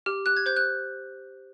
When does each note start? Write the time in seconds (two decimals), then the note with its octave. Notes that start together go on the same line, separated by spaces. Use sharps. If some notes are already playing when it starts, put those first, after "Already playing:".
0.06 G4 F6
0.26 G4 F#6
0.37 G#6
0.46 C5 G6
0.56 F#6